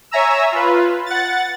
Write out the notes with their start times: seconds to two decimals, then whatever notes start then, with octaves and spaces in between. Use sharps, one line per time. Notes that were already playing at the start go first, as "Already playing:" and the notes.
0.11 C#5 E5 G#5 A#5 E6
0.52 F4 B4
1.06 F#5 A6